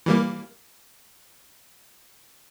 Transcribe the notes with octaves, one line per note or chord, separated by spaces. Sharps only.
E3 G3 A#3